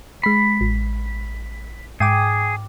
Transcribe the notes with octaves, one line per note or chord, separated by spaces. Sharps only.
G#3 B5 C7
A1
G#2 G#4 G5 D6